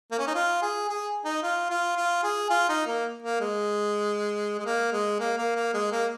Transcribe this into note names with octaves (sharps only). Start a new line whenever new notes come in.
A#3
C#4
D#4
F4
G#4
G#4
D#4
F4
F4
F4
G#4
F4
D#4
A#3
A#3
G#3
G#3
A#3
G#3
A#3
A#3
A#3
G#3
A#3